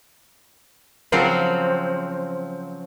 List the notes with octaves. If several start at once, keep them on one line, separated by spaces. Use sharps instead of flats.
C#3 F3 F#3 C4